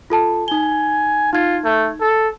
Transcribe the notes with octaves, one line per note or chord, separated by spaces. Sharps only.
F4 A4 A5
D#4 G#5 G7
D#4 F4 G#6
A3
A4